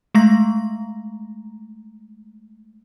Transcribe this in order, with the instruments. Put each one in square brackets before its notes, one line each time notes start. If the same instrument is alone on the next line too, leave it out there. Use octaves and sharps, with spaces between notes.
[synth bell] G#3 A3 A#5 A#6